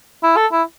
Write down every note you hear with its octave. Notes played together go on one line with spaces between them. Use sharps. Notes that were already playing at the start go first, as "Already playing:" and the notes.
E4
A4
E4